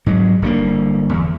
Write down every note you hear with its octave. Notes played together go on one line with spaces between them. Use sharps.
G#2 F#3 G#3
G1 D3 G3 A#3
E2